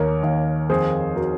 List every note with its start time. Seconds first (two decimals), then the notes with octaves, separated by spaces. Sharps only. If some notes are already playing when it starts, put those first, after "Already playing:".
Already playing: D#2 A#4 C#5
0.23 D#2
0.70 F2 G#4 C5
1.16 F#4 A#4